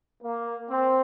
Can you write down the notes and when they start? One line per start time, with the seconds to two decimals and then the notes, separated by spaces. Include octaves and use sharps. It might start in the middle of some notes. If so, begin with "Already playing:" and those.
0.22 A#3
0.69 C4